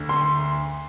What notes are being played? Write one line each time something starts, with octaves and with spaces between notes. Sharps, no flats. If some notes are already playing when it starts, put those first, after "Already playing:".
Already playing: D2 D3
C6